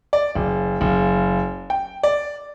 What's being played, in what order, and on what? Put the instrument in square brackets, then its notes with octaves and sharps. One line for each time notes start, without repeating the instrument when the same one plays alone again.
[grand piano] D5
F#1
F#1
G5
D5